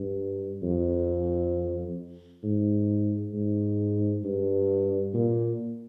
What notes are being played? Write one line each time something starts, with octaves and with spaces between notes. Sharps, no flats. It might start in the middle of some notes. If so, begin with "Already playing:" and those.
Already playing: G2
F2
G#2
G#2
G2
A#2